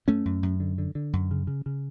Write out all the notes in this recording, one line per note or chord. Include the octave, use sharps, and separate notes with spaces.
F#2 A3 C#4
F#2
F#2
D3
D3
D3
F#2
C#3
C#3
C#3